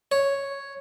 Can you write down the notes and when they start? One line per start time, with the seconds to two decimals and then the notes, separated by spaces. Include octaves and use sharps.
0.12 C#5